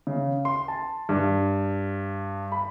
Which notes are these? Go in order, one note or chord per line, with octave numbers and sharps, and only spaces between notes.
C#3
C6
A5
G2
B5